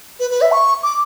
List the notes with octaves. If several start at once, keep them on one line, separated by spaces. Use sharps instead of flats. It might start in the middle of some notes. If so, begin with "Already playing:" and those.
B4
B4
E5
C#6
D6